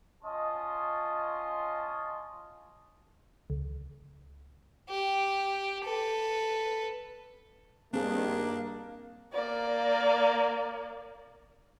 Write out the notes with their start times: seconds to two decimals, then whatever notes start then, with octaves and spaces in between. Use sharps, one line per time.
0.23 C#4 F4 D#5 A5 C6
3.50 C#2
4.89 G4
5.84 A4 B4
7.93 G2 D#3 A#3 C4 D4 G#4
9.34 A#3 D5